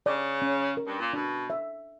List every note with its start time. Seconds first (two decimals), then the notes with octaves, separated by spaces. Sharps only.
0.06 C#3 D5
0.42 C#4
0.77 A#4
0.87 G2
1.00 A#2
1.13 B2 D4
1.50 E5